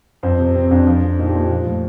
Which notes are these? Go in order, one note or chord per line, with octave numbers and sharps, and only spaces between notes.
F2 C5
C3
C3 C4
F2 D4
F3
F3
A#2 D#4
G4
A#2 F4
F3
A2